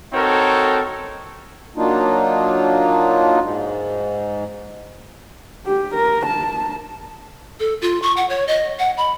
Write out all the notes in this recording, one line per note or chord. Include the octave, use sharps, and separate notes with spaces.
C4 D#4 F#4 A4 A#4 C#5
F#3 A#3 D4 D#4 F4
G#2
G4
A#4
A5
A4
F4
C#6
F#5
C#5
D#5
F#5
B5